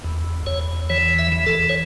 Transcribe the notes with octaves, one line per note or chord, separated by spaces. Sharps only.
E2
E2 C#5
E3 C#5
E5
E3
A4
C#5